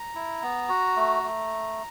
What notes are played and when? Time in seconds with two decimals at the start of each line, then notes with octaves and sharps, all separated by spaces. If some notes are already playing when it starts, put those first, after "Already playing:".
Already playing: A#5
0.15 E4
0.42 B3
0.69 F#4
0.96 A3
1.23 A3